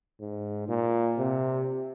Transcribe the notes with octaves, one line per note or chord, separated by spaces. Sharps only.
G#2
A#2
C3